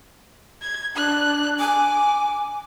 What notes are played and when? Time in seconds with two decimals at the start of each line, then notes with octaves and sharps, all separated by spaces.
0.61 G#6
0.96 D4 F#6
1.59 G#5 D6